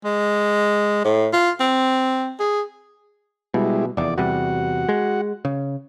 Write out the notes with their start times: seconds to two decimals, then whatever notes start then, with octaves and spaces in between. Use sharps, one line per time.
0.05 G#3
1.05 A2
1.33 F4
1.60 C4
2.40 G#4
3.54 B2 G3 G#3 E4
3.97 F1 E2 D5
4.18 E2 C3 G3 F#4 F#5
4.89 G#3
5.45 C#3